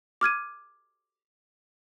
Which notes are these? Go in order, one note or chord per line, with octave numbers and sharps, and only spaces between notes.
D6 F6 G#6 D#7